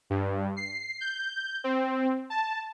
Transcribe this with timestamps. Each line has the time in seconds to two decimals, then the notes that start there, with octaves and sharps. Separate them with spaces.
0.10 G2
0.57 C7
1.01 G6
1.64 C4
2.30 A5